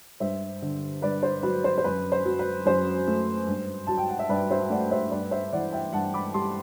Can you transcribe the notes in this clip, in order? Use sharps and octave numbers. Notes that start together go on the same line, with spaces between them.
G2 C5 E5
D3
G2 B4 D5
C5
F#3 B4
C5
C5
F#2 B4
C5
F#3
B4
F#2 C5
A3
G2
F#3 A5
G5
F#5
E5
G2 B4 D5
C5 E5
A3 D5 F#5
C5 E5
G2 B4 D5
C5 E5
E3 D5 F#5
E5 G5
G2 F#5 A5
B5 D6
G3 A5 C6